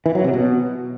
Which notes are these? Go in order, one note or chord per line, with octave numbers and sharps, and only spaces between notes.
E3
F#3
C3
B2